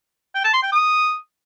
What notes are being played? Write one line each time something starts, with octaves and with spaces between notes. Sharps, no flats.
G5
A5
C6
G5
D#6